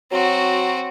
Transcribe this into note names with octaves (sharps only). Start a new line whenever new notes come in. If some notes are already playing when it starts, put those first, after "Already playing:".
F#3 C4 F#4